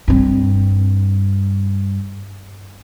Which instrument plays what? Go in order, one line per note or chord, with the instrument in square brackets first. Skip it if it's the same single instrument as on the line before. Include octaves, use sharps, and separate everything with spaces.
[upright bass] G2 C4